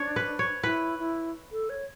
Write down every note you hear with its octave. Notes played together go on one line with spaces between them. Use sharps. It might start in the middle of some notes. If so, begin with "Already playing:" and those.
Already playing: D4 C#5
B4
C#5
E4 B4
E4
A4
C#5